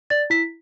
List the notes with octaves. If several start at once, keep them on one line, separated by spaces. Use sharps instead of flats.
D5 A6
E4 B6